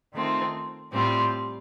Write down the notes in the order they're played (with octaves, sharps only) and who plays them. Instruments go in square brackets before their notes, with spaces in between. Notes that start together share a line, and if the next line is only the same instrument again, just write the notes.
[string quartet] D#3 A3 C4 F4
A2 G3 C4 F4